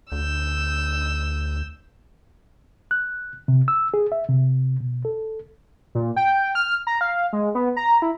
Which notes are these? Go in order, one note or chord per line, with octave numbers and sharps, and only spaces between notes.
D2 E6 G6
F#6
C3
E6
G#4
E5
C3
B2
A4
A#2
G5
F6
A#5
F5
G#3
B3
A#5
E4